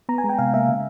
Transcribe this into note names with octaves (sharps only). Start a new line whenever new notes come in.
B3 A#5
G#5
G#3
G5
C3 F5
A#3 E5
C#3